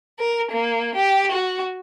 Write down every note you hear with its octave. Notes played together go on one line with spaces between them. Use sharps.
A#4
A#3
G4
F#4